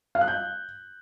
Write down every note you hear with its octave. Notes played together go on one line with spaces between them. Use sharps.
F5
F#6
G6